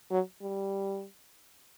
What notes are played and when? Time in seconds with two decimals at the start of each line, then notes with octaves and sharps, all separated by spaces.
0.11 F#3
0.42 G3